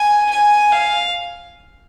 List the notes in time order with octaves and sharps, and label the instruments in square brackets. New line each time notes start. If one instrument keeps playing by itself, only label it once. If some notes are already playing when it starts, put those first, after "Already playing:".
Already playing: [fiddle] G#5
G#5
F5